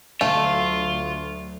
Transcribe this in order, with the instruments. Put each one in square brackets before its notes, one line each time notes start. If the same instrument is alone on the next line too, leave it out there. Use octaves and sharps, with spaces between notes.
[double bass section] D2 F#3 [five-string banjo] A3 [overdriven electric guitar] F4 [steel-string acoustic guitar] F5